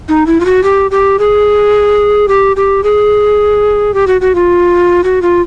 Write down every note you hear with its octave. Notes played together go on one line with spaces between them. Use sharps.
D#4
E4
F4
F#4
G4
G4
G#4
G4
G4
G#4
G4
F#4
F#4
F4
F#4
F4